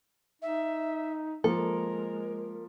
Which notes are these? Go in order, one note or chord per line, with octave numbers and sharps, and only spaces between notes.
D#4 E5
F3 G#3 A#3 A4 A#4